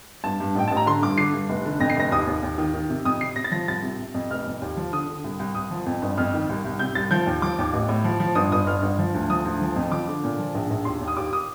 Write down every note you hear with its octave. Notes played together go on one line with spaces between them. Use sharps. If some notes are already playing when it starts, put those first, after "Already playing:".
G2 A5
G2
A1 G5
A1 A5
A#5
D3 C6
G2 D6
D3 C7
G2
F1
D3
F2 A#6
C7
F1 A#6
D#2 D#6
D#2
D#2
D#3
D#3
C3
F2 D#6
C3 C7
C3 A#6
A6
F3 A#6
C2 A6
C3
C3
F2
F1 F6
F2
D#2
F3
D3 D#6
D3
C2
C2
C2 D#6
F3
F2
G1
F2 F6
D#3
C2
C2
C3 G6
C2 A6
F3 G6
D#2
F3 D6
D#2
A1
A2
F3
F3
G1 D#6
G1 D#6
G1 F6
G1
F3
D2
F3 D#6
D2
F3
F2
F3 D6
D3
A#2
F3
A#1
A#1
D#2 C6
D#2
D#6
D#2 D6
D#6